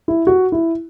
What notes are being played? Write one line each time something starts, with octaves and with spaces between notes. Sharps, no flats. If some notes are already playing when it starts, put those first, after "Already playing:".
E4
F#4
E4